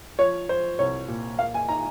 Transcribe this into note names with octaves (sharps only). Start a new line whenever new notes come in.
F3 C#5
F3 C5
C2 C#5
A#2
A#3 F5
G#5
D#4 A#5